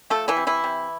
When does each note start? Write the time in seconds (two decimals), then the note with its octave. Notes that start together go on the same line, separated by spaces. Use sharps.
0.10 F3 A3 A4
0.28 E3 E4
0.37 C3
0.47 E3 E4
0.64 C3